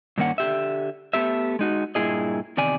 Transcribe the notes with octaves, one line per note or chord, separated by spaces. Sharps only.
G2 D#3 A#3 C#4 F#5
D3 G4 E5
A3 B3 G4 E5
G#3 D#4 F#4
G2 A#2 E4 G#4 D#5
E2 C3 D#3 D5 G#5